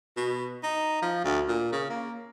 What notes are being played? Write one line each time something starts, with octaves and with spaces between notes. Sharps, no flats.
B2
D#4
F3
D2
A#2
C#3
A#3